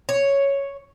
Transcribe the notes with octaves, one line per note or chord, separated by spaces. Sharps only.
C#5